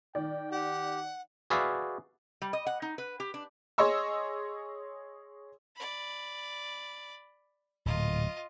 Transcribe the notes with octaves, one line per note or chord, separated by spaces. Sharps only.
D#3 D5 G5
G4 F#5
F#4 G#4 B4 D5 E5 F5
G3
D#5
F#5
D#4
B4
G4
D4
G#4 C#5 D#5 C6 C#6 E6
D5 B5
D1 A#2 F4 D#5